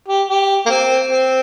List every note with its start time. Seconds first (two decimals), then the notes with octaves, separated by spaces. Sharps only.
0.08 G4
0.29 G4
0.66 A#3
0.70 C4
1.10 C4